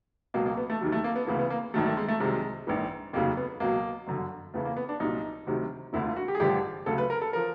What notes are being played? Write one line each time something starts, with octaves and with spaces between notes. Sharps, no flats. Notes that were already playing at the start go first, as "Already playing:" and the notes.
C#2 B2 F#3 A#3
A#3
B3
A3
D#2 D#3 F#3
A3
A#3
B3
D2 C#3 E3 A#3
B3
A#3
A#1 G#2 D#3 F#3 A3
A3
G#3
A3
C2 C3 D#3 F#3 G#3
A#1 G#2 E3
F1 D#2 C#3 F#3 A#3
B3
C#2 B2 F#3 A#3
G1 F#2 D3
E2 C#3 E3 A3
A#3
B3
D4
C2 A#2 F#3 D#4
D2 C3 D#3 F#3
E1 D2 D3 E4
F4
F#4
G4
G#4
A1 G2 D3 F3 G4
D2 C#3 F#3 A4
B4
A#4
A4
F3 A#4